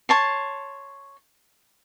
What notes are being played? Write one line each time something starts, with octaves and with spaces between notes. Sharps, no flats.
C#5 A5 C6